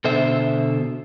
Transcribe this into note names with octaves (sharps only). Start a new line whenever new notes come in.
B2 D3 A4 C5 E5